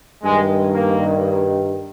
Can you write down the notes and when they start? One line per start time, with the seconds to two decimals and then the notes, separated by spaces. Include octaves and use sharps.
0.24 G2 D#3 G#3
0.74 A#3